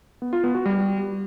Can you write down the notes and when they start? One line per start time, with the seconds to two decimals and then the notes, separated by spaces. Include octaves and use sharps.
0.22 B3
0.33 F4
0.44 B3
0.55 F#4
0.66 G3